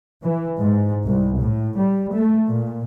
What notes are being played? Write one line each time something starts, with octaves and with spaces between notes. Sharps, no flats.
E3
G#2
C2
A2
G3
A3
A#2